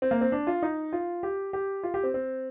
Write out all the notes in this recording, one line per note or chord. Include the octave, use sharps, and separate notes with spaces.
C4
A#3
C4
D4
F4
D#4
F4
G4
G4
F4
G4
C4
C4